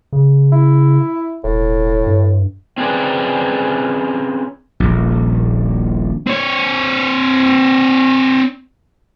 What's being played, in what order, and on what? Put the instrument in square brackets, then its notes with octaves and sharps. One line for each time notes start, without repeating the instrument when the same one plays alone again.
[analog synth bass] C#3
[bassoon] E4
[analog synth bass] E1 [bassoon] A2
[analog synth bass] G2
[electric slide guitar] C4 C#4 F4 G#4 B4 D5
[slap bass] D#1 A#1
[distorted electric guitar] C4 C#5